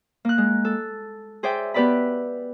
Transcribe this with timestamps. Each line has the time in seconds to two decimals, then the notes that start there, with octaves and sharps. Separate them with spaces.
0.25 A#3 F#6
0.38 G#3
0.65 A4
1.43 G#4 C5 D5 E5 G5
1.74 B3 G4 B4 D5 E5 B5